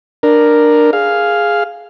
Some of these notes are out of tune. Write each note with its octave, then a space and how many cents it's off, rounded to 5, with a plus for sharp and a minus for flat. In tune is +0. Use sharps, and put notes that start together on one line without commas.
D4 +15 A#4 +0
G#4 +0 F5 +0